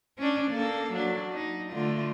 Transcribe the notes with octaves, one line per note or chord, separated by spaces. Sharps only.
C#4 D4
A#3 A4
F#3 D4
D#4
D3 A3 F4